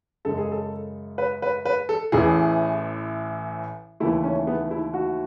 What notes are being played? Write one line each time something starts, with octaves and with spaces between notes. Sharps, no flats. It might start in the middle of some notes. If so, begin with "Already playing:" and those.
F#2 C#3 G#3 A4
G#4
A4
B4
B4
B4
A4
A1 A2 E3 G#4
D#2 C#3 E3 A3 E4
C#4
B3
E4
F#4